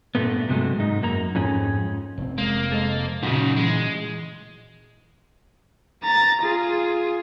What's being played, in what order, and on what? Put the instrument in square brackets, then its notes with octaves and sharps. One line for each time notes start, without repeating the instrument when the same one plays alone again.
[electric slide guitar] G2 A#2 A3 B3
G2 C3 F#3 G#3 A3
G#2 D#4
F#2 A#3 A#5
F2 G#2 C#4 G#4
[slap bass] F1 A2 C4
[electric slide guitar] G#3 G#4 [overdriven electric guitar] A#3
[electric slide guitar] A4 C5 D#5
[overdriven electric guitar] F#2 C#3 [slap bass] A#2 [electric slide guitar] D#4 F#4
[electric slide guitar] E3 [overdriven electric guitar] G#3
[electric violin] A#5 A6
F4 G#4